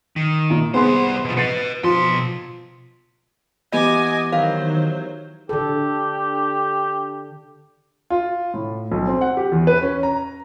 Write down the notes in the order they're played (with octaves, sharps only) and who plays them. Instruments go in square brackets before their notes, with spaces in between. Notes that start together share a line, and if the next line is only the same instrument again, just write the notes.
[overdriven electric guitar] D#3
[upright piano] A#2 A#5
[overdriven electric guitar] C2 C5 [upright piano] B3 G#4 C6
[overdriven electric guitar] B2 F3
[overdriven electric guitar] B4 D#5 [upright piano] A6 C7 C#7
[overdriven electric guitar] B2 C6 [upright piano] F3
[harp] E3 B3 G4 [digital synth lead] D#5 [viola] G#5 D6
[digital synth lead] D#3 [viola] F#3 C5 [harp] A#4 [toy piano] F5
[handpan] D3 A4 [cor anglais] G4
[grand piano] F4
A2
B1
C4
F#5
G4
E2
B4
C#4
A#5